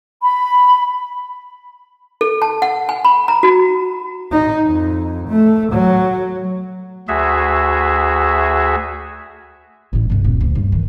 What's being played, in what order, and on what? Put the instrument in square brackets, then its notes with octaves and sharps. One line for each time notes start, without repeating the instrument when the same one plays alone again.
[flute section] B5
[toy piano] A4
A5
F#5
G#5
B5
A#5
F#4
[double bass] D#4
F2
A3
F#3
[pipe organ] D2 F#4 G#4 E5
[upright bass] A1 E4
C2 G2
D#1
D2 C4
G2
D#3 E3